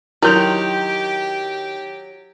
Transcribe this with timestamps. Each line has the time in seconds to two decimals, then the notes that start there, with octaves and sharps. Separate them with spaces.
0.22 D#3 F#3 E4 G4 C6 G6 F7